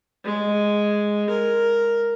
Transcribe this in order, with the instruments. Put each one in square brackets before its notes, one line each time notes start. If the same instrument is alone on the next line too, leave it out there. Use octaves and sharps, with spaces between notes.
[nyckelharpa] G#3
A#4